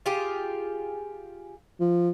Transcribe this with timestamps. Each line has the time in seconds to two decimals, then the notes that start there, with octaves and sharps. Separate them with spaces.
0.06 F4 G4 G#4
1.80 F3